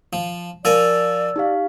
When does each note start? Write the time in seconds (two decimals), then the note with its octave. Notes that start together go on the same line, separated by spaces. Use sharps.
0.13 F3
0.65 F3 A#4 D5 G#5 E6 A6
1.36 D#4 G4 F5